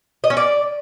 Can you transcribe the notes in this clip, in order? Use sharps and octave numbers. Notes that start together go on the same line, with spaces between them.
D#5
C#4
D5